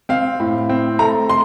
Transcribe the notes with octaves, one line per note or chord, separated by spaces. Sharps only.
C4 F5
A2
C4
A3 A#5
C6